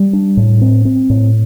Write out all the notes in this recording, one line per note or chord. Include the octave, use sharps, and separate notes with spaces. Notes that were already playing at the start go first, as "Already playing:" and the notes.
Already playing: G3
D4
A2
C4
C4
A2